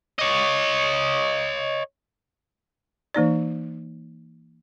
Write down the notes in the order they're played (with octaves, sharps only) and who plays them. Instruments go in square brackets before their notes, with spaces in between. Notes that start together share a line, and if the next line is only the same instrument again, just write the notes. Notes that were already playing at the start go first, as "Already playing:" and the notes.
[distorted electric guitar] C#5 D#5
[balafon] E3 A#3 D#4 D5